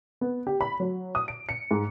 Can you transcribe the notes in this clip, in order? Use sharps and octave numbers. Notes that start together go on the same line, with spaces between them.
B3
G4
B5
F#3
D#6
D7
C#7
G#2